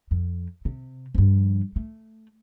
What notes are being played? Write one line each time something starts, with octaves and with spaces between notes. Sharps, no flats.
F2
C3
G2 F3
A3